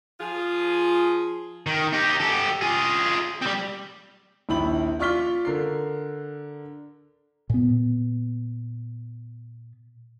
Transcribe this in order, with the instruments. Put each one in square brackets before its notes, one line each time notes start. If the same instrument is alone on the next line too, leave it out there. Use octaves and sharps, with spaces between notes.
[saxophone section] F3 F4 G#4
[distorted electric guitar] D#3
D#4 G4
G4 A4
F4 G#4
G3 C4
[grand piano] A#1 D#2 E4 B5 F#7
F4 D5 C#6 F6 B6 G7
D3 A#4 C7
[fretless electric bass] A#2 B3